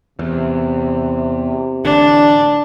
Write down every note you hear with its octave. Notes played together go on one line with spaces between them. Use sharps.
E2 C3
A1 D3 D4